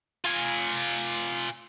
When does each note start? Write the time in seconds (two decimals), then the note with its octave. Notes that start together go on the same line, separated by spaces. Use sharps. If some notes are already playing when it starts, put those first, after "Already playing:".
0.25 F4 G#5